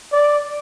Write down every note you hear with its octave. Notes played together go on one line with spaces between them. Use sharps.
D5